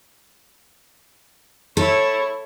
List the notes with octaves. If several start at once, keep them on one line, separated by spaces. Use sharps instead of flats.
E4 A4 C#5